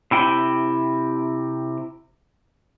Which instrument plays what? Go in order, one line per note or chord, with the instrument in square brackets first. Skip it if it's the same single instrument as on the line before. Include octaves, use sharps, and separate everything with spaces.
[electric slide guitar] C3 E4 G5